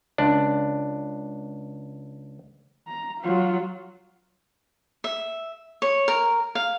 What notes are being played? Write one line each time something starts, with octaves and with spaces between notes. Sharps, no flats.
C#2 D4
A#5
F#3 F4
E5
C#5
A#4
F5